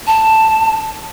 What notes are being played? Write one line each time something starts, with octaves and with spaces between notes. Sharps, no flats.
A5